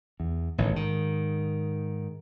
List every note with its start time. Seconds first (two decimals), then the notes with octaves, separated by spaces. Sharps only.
0.20 E2
0.58 A1 A2 D#3
0.72 G#2 D#3